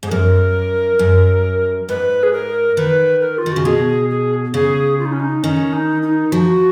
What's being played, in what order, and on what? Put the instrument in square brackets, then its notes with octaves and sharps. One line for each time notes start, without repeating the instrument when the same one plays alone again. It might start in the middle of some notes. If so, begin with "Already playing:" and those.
[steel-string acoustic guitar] G#2 [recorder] G#4
[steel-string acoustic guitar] F#2 [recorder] A#4
[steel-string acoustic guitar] F#2
[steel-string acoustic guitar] G#2 [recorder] B4
[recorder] G#4
A#4
[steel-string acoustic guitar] D#3 [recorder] B4
[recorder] A#4
F4
[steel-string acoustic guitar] D#3
[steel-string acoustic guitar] C#3 [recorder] F#4
[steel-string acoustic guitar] B2 [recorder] G#4
[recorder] G#4
[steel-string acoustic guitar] C#3 [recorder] G#4
[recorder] F4
D#4
C#4
D#4
[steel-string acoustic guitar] D#3 [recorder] C#4
[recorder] D#4
D#4
[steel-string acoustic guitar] F3 [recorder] F#4